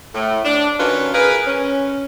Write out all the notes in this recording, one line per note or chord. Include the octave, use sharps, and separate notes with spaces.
A2
D4
D#3 C#4 D#4 F4 F#4 B4
G#4 A#4 B4
C#4